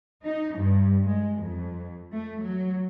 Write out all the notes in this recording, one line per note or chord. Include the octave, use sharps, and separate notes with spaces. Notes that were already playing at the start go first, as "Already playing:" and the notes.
D#4
G2
G#3
F2
A3
F#3